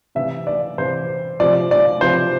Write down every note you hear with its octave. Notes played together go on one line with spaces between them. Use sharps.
C3 E3 E5
D5
C3 E3 C5
C3 F3 D5
D5
C3 F3 C5